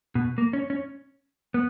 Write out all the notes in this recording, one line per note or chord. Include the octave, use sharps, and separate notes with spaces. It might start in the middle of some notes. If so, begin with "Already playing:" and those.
B2
A#3
C#4
C#4
B3